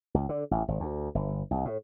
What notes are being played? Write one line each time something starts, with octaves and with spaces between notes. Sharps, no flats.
C#2
D3
A1
G#1
D2
G1
C2
A2